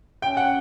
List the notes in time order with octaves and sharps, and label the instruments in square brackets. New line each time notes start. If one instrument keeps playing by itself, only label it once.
[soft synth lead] C#4 [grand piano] G5
[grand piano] F#5